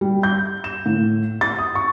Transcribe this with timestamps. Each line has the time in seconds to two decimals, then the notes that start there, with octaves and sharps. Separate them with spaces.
0.01 G3
0.23 G6
0.64 E7
0.86 A2
1.41 A6
1.59 D#6
1.75 C#6